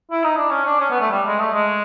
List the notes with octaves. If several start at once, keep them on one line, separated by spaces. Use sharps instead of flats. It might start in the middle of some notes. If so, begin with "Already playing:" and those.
E4
D#4
D4
C#4
D4
C#4
B3
A3
G3
G#3
A3
G#3